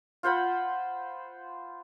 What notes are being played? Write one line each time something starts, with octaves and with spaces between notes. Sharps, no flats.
F4 C5 F#5 B5